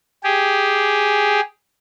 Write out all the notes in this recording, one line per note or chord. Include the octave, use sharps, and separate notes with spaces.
G4 G#4